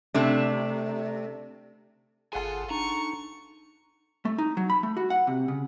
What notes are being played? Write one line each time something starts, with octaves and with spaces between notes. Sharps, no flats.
C3 A3 D4
G1 F4 G#4 A4 F#5 G#5 C6
D4 D#4 A#5 C#6
A3
D#4
F#3
B5
A3
F#4
F#5
C3
C#3